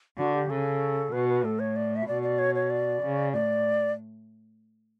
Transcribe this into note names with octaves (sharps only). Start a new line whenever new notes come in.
D3 F#4
G4
C#3 A4
B2 B4
B4
A2 A4
C#5
D5
E5
B2 D5
D5
C#5
C#5
D5
C#3
A2 D5